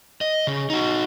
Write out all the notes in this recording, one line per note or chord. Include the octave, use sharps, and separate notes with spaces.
D#5
C#3
D#4 F#4